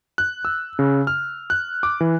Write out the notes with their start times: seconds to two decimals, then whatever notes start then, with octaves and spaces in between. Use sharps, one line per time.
0.18 F#6
0.45 E6
0.79 C#3
1.07 F6
1.50 F#6
1.83 D6
2.00 E3